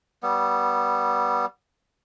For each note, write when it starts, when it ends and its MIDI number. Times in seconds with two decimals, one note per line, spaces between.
0.23 1.46 55
0.23 1.46 59